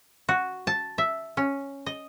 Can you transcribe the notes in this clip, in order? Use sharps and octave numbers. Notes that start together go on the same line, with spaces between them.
F#4
A5
E5
C#4
D#5